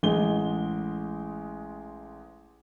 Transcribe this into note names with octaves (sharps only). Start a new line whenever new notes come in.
A1 G#3 G7